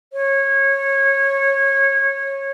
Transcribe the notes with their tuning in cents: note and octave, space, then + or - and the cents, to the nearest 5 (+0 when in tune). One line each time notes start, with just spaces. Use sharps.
C#5 -20